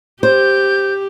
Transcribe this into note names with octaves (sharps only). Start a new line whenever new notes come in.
G4 C5 G6